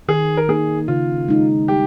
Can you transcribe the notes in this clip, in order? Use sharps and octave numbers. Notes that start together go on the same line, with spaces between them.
D#3 G#4
A#4
A#3 D#4 G#4
C#3 F4
G#3 D#4
G3 G4